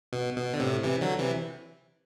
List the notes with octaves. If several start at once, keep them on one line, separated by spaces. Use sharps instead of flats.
B2
B2
D3
A2 C3
C3 E3
D3 F#3
C3 E3